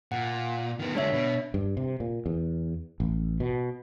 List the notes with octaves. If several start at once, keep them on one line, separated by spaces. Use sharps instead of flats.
A#2 F#5
D#3 B3
D3 G#3 D4 C#5 E5
B2
G2
C3
A#2
E2
A1
B2